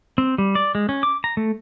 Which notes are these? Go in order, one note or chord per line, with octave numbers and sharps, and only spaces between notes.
C4
G3
D5
G#3
C#4
D6
A#5
A3